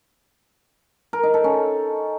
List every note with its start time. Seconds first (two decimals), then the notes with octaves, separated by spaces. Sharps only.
1.13 A#4
1.23 D#4
1.34 A4
1.44 C#4